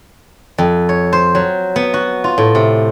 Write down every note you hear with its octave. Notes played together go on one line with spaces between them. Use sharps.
F2
C#5
C5
F#3
B3
F#4
F4
A2
C3